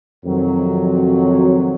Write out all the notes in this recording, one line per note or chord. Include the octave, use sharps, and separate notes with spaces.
F2 C3 D#3 F#3